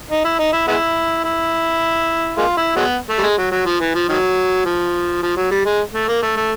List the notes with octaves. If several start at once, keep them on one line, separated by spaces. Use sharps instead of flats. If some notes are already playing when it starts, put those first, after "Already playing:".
D#4
E4
D#4
E4
G#3 B3 E4
E4
G#3 A#3 F4
E4
F#3 G#3 B3
A3
G3
G#3
F#3
F#3
F3
E3
F3
D#3 F#3
F3
F3
F#3
G3
G#3
A3
A#3
A3
A3